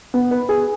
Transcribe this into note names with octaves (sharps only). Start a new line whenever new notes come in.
B3
B4
G#4